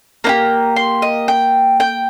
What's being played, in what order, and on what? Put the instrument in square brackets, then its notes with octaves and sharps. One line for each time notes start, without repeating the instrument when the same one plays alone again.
[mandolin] A#3 D#4 G4 A#5
C6
D#5
G5
G5